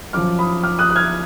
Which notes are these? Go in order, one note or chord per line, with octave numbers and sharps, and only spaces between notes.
F#2 F3 D6 F6
B5 D#6
D6 F6
D#6 F#6
F#6
F6 G#6